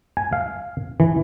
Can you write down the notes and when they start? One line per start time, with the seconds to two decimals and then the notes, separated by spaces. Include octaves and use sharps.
0.17 G#5
0.33 F5
1.00 E3